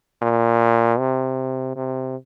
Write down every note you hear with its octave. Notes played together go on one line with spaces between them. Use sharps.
A#2
C3
C3